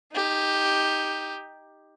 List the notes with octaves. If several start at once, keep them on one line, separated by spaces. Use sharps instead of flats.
D#4 G4